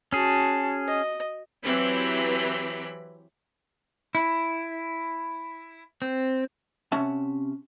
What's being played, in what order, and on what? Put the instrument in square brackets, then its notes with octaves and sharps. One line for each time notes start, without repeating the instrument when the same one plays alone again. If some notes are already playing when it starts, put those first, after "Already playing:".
[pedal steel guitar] C#4 G#4 [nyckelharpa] F#4 A5
[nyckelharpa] D#5
[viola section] E3 F#3 C4 G4 B5
[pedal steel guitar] E4
C4
[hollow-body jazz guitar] C3 C#4 E5 F#5 A5